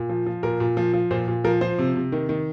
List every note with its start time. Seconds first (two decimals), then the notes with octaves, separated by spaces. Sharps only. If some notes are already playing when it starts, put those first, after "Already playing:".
Already playing: A#2
0.10 F3
0.26 F3
0.43 A#2 A#4
0.60 A#2
0.77 F3
0.94 F3
1.11 A#2 C5
1.28 A#2
1.44 F3 A#4
1.61 F3 C5
1.79 C3
1.96 C3
2.12 D#3
2.29 D#3